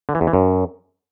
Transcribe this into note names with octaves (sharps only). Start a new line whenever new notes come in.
D3
E3
E2
E3
F#2